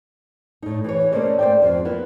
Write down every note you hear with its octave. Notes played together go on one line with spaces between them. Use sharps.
A2 D#4
E3 C#5
A3 A#3 C#4 C5 D5 D#5
C5 D5 G5
F2 F3 C4
A#3 B3 E4